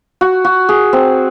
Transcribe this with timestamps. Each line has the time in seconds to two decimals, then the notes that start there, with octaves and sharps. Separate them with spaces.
0.21 F#4
0.45 F#4
0.69 G#4
0.93 C4